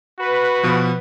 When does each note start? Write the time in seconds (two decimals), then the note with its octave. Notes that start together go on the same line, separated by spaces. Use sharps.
0.20 F#4 B4
0.63 B2 F3